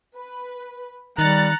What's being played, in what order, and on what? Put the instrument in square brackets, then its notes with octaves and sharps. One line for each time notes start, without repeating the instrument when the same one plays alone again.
[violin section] B4
[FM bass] D#3 [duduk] G3 [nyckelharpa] A#5 [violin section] F#6 A6 C#7